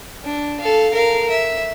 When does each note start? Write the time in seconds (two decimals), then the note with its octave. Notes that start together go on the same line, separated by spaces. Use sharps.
0.24 D4
0.60 A4 F5
0.93 A#4 F5
1.30 E5